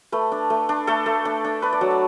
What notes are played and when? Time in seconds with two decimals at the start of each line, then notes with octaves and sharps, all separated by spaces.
0.12 A3 B4
0.32 D4
0.50 A3
0.69 D4
0.87 A3 A4
1.06 A3
1.25 D4
1.44 D4
1.62 D4 B4
1.73 D5
1.81 F#3 F#5
1.91 A5